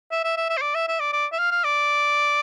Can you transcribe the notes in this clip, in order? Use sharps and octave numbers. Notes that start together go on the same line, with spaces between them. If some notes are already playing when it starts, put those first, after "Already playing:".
E5
E5
E5
E5
C5
D5
E5
E5
D5
D5
E5
F5
F5
D5